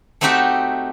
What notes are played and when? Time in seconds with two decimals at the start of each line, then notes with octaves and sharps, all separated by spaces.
0.21 A3 C4 D#4 F#4 G4 E5